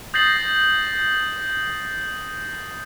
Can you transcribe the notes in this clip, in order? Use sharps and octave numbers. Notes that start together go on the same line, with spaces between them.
D#6 G6 A6 A#6 C7 F#7